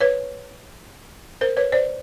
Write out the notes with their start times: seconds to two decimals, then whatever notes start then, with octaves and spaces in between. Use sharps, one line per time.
0.01 B4 C#5
1.41 A#4 C5
1.57 B4 C#5
1.72 C5 D5